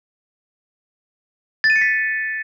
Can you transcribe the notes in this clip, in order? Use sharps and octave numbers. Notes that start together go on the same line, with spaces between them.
A6
D#7
C#7
B6